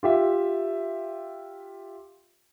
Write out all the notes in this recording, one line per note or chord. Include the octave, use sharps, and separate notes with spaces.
F4 G4 E5